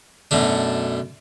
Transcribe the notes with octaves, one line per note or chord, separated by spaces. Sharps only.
F#2 B2 A3 D4